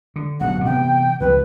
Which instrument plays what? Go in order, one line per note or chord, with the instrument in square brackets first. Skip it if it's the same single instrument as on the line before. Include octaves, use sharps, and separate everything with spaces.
[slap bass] D3
[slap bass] D1 B1 [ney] F#5
[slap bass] C3 E3 B3 [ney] G5
[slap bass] C#2 F3 [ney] B4